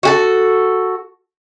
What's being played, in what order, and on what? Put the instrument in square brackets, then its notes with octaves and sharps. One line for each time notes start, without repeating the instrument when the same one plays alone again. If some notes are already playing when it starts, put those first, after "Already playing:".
[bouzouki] F#4 G4 A4